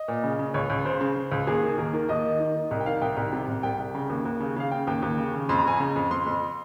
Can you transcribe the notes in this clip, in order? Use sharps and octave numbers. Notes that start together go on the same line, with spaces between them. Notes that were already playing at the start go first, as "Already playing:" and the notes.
Already playing: D#5
A#2
C#3
C#3
C#2 C#5
C#2
C#3 C5
C#3
C#3
C#2
D#2 G#4
D#3
D#2 A#4
D#3 A#4
D#2 D#5
D#3
D#3
D#3
C2
G5
D#3 F5
C2 G5
C2
C3
C2
C2 G5
C2
C#3
D#2
D#2
C#3
C#3 F5
C#3 G5
D#2 G5
D#2
C#3
C#3
F2 C6
A#5
F2 G#5
C#3 A#5
F2
F2 C6
F2